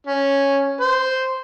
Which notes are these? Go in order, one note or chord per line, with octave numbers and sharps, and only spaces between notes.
C#4
C5